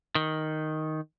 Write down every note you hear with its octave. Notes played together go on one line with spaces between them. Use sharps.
D#3